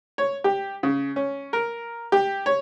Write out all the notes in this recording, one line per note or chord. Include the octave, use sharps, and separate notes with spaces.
C#5
G4
C#3
C#4
A#4
G4
C#5